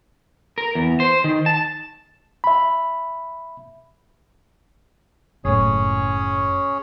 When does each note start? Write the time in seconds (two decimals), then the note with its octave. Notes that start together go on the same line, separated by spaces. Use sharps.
0.58 A#4
0.75 E2
1.00 C5
1.24 D#3
1.46 A5
2.44 E5 B5
5.45 F#1 A2 C#4 G#4 C#5